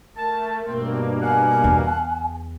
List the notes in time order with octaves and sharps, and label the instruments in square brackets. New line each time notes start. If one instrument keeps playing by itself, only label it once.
[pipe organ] A3 [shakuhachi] A#4 [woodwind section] A5
[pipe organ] G2 B2 A#3 [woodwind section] A3 C4
[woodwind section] F5 F#5 [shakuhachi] G#5
[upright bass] E2